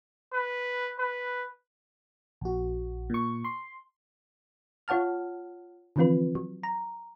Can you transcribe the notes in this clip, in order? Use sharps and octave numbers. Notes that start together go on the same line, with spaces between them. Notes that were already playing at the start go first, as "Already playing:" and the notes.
B4
B4
A#1 F#4
A#2 C#6
C6
F4 C#5 F#5 A5 F6
D3 E3 F3 C4 F4 B4
F#3
A#5